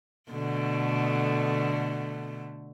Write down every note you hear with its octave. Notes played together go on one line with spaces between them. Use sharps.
B2 D3 A3